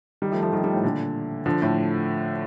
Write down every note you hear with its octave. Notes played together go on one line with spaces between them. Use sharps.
D#3 G3
F3 A3
F3 A3
D#3 G3
D#3 G3
A2
A#2 D3
D3 F3
A2